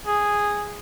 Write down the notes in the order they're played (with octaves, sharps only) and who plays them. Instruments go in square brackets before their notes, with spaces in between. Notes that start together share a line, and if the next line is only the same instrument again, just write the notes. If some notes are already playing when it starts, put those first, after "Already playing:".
[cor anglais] G#4